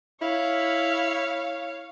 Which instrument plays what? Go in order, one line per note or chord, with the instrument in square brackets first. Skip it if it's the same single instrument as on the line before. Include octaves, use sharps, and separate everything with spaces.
[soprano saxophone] E4 [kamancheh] C#5 F5